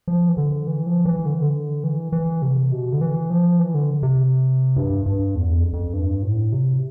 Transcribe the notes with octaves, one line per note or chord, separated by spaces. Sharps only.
F3
E3
D3
E3
F3
E3
D3
E3
D3
E3
E3
C3
B2
D3
E3
F3
E3
D3
C3
G2
G2
E2
F2
F2
G2
A2
C3